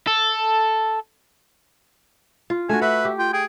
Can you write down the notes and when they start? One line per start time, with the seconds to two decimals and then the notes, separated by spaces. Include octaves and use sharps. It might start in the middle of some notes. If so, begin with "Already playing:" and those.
0.07 A4
2.50 F4
2.69 A3 D4 F#4 G#5
2.82 B4 E5 F#5
3.05 G4
3.19 F4 G5
3.33 G#4 G5